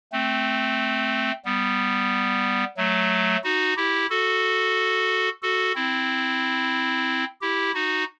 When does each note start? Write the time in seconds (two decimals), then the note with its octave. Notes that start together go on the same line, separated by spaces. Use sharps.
0.12 A3 C4
1.45 G3 B3
2.77 F#3 A3
3.44 D#4 F#4
3.76 E4 G4
4.10 F#4 A4
5.42 F#4 A4
5.75 C4 E4
7.41 E4 G4
7.74 D#4 F#4